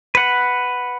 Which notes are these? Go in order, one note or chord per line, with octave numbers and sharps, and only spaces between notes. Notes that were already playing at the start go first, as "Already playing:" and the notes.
B4 F#5